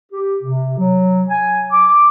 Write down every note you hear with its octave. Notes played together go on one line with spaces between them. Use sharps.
G4
C3
F#3
G#5
D6